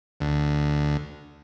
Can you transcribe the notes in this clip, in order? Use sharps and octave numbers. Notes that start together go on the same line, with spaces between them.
D2